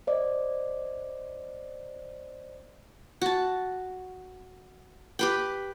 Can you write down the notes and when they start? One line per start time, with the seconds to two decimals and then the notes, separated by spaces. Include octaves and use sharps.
0.07 C5 D5 D#5
3.21 F#4 A5
5.19 G4 B4 G5